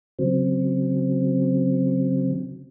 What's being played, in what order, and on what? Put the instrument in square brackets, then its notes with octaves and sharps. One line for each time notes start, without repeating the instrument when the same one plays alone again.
[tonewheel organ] C#3 F#3 C4